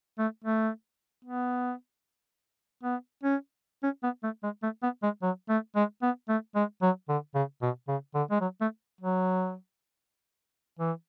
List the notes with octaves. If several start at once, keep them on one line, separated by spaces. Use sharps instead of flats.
A3
A3
B3
B3
C#4
C#4
B3
A3
G#3
A3
B3
G#3
F#3
A3
G#3
B3
A3
G#3
F#3
D3
C#3
B2
C#3
D3
G#3
F#3
A3
F#3
E3